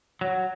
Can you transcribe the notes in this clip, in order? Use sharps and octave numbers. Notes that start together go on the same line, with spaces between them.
F#3